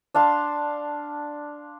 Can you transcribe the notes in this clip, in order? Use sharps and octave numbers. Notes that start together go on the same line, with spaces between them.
D4 F5 A5 C6